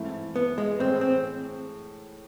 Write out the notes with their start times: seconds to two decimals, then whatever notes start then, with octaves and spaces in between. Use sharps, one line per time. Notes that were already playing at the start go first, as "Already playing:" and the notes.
Already playing: G#2 E3 A3 C4 E4
0.36 B3
0.58 G#3
0.79 A2 E3 G#3 C4
1.01 C4